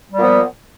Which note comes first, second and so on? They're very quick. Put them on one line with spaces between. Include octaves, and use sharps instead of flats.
G3 A#2 B3 F3